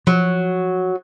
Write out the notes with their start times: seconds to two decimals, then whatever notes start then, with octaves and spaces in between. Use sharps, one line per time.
0.07 F3 F#3